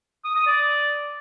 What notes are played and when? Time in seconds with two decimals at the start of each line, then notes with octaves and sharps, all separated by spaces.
0.24 D#6
0.36 D#6
0.47 D5